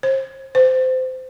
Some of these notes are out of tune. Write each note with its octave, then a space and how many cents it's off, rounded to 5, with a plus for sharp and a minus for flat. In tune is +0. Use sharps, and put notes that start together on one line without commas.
C5 +35
C5 -20